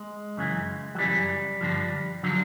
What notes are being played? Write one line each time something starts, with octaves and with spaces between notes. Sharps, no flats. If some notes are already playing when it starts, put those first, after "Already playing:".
Already playing: G#3
F#2 C#3 E3
F#3
F#2 C#3 E3 G3
G2 D3 F3
D3 F3 F#3